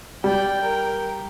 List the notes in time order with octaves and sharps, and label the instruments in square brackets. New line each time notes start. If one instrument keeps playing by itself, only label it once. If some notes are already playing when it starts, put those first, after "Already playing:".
[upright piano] G3 [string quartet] D5 [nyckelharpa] G5
[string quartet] A#4